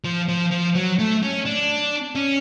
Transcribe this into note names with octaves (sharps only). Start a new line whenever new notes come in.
F3
F3
F3
F#3
A3
C#4
D4
C#4